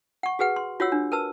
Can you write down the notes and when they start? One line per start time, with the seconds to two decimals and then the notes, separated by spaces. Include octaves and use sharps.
0.23 F#5 C#6
0.39 F#4 G#4 B4 F#5
0.56 C6
0.80 F4 F#4 C#5 F#5 E6
0.92 D4
1.12 A#4 B4 A5 E6